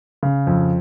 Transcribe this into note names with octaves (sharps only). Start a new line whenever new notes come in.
C#3
F2